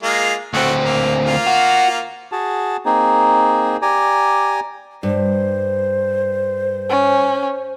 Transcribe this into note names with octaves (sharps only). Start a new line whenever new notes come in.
G#3 A#3 F4
D2 A3 C4 F#4
A#3
A#3 F4
F#4
F#4 G#4 A5
A#3 C4 D#4 G#4
G4 D5 G#5 A#5
G2 C5
C#4